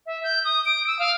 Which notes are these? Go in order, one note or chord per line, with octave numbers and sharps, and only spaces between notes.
E5
G6
D#6
D7
E6
F5